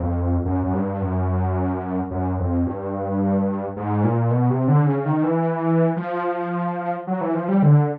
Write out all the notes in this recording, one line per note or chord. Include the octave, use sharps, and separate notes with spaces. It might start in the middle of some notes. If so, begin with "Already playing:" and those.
Already playing: F2
F#2
F#2
G2
F#2
F#2
F2
G2
G#2
A#2
B2
C3
D3
C#3
D#3
E3
F3
F#3
E3
F3
G3
D3